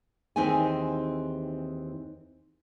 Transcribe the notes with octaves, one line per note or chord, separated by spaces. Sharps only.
D#2 E3 C4 D#4 G#4 G#5